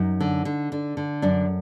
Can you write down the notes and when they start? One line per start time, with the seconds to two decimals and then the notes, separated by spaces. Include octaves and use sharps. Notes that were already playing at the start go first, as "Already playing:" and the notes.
Already playing: F#2 D#4
0.20 D3
0.45 D3
0.72 D3
0.97 D3
1.22 F#2 D4